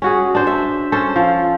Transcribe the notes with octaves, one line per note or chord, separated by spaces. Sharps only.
C#4 F#4 G#4
D4 C5
E5
C#4 A4 C5
F3